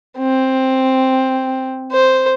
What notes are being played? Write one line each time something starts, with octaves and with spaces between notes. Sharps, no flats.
C4
C5